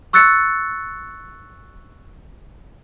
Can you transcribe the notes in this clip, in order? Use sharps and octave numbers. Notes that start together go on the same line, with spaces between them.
C#6 E6 F#6 A6 C#7